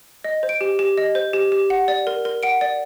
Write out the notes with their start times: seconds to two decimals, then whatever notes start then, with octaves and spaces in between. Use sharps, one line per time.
0.24 D#5
0.43 C5
0.49 D7
0.61 G4
0.79 G4
0.98 D#5
1.15 C5
1.33 G4
1.52 G4
1.70 F#5
1.88 D5
2.07 A#4
2.25 A#4
2.43 F#5 D7
2.61 D5